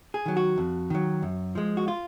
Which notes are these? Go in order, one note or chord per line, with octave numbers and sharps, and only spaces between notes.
G#4
D#3 F#3
F#4
F2
D#3 F#3
F#2
F3 G#3
F#4
F4